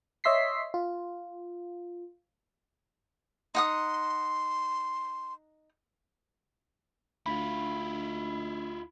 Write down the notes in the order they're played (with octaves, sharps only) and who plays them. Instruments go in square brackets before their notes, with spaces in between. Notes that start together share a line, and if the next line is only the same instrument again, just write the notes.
[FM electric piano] C#5 D#5 E5 C6 B6 C7
F4
[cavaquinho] D#4 F#5 D#6 [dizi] C6
[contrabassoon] D2 [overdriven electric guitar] E4 F4 [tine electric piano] B5